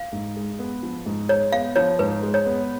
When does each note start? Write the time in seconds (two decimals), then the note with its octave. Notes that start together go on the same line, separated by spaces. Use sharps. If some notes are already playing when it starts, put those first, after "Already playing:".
Already playing: F5
0.12 G#2
0.36 G#3
0.59 B3
0.83 F3
1.06 G#2
1.29 G#3 C#5
1.52 B3 F5
1.76 F3 C#5
1.99 G#2 B4
2.23 G#3
2.34 C#5
2.46 B3